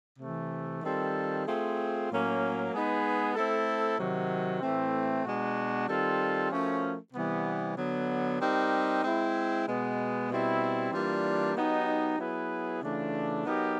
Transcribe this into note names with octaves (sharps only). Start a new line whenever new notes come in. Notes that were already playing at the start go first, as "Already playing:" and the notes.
C3 E3 A3
D#3 G3 C4 F4 A4
A3 C4 F4 G#4
A2 F#3 A#3 C#4
G#3 B3 D#4 G#4 B4
A3 C4 E4 A4
C3 D#3 F#3
A2 E3 A3 C4
B2 G#3 B3 D4 F#4
D#3 G3 C4 F4 A4
F3 A3 C#4 F#4 A#4
C3 E3 G3 B3
D3 F#3 B3
G3 C4 D#4 G4 A#4
G#3 C4 E4
B2 G#3 B3
B2 G3 C4 E4
E3 G3 A#3 D4 F4
F#3 B3 D#4 G4
F#3 B3 E4 G#4 B4
C#3 E3 A3 D4 F4
F#3 B3 D#4 G4 A#4